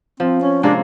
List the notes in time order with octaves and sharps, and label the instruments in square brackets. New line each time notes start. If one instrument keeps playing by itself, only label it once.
[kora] F3 [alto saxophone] C4
[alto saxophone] C#4
[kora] C3 G#3 A#3 [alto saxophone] D4